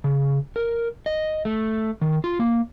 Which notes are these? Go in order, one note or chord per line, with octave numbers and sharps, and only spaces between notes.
C#3
A#4
D#5
A3
D#3
F4
A#3